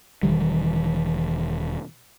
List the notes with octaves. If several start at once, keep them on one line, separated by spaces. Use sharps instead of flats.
E1 D#3 E3 G3